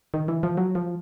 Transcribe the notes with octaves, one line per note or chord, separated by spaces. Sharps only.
D#3
E3
F3
F#3
F3